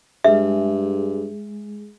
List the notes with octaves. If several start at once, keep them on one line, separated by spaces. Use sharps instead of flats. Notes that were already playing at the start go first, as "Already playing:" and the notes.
G2 G#3 G#4 E5